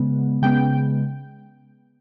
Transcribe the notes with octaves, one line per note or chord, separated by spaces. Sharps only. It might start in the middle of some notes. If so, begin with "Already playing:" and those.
Already playing: C#3 G#3 B3
C#3 G#3 B3 G5